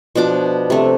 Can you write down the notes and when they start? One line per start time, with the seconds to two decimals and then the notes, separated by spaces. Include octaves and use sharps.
0.15 B2 F3 D4 D6
0.70 C3 A3